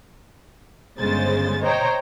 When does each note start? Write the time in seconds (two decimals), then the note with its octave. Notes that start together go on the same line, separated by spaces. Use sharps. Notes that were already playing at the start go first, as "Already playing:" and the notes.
0.99 G1 C#3 G#3 C5 A6
1.63 C5 C#5 D#5 G5 A#5